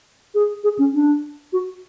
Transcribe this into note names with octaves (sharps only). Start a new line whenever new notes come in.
G#4
G#4
C#4
D4
F#4